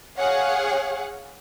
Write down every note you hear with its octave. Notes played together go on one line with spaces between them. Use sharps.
G#4 C#5 F5 F#5